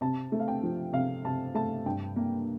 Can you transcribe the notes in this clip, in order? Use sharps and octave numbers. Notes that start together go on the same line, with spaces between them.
C3 A5
A3
F5
G5
F3
C3 F5
C3 A5
A3 A5
G2 G5
A#3